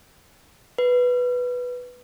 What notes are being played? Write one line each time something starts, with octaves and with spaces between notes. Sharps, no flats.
B4